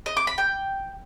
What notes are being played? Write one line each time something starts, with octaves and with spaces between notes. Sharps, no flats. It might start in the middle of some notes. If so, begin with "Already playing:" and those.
D#5
D6
B5
G5